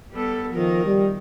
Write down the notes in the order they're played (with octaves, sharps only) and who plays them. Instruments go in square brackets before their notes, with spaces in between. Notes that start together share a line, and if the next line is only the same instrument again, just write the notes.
[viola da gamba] G3 B3 A4
[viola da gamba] D#3 A#4 [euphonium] F3
[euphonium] G3